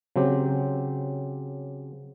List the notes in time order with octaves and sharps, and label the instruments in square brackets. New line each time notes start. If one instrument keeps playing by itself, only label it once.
[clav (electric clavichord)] C#3 F#3 C4 G4